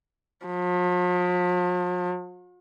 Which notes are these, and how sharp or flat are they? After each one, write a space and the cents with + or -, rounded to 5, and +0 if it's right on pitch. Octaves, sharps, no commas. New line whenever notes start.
F3 +45